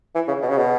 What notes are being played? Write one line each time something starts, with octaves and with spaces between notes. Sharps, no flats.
E3
C#3
B2
C#3
B2